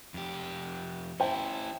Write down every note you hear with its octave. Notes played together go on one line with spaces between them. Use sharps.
F2 G4
C#4 E4 C5 G5 A5